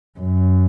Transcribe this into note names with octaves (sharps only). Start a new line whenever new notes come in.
F#2